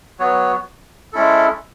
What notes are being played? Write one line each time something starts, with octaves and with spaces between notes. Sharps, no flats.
F#3 B3 F#4 C#5
G#3 C#4 E4 A4